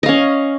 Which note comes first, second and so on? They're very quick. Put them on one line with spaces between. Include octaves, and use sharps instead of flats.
D#5 F5 C#4